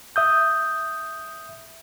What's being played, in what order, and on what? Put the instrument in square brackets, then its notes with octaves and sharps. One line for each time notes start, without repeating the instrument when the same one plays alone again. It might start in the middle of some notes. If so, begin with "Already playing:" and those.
[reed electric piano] E5 D#6 G6